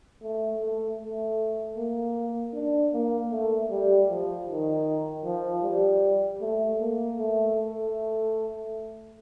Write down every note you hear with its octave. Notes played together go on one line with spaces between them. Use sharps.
A3
A3
A3
A#3
D4
A#3
A3
G3
F3
D#3
F3
G3
A3
A#3
A3
A3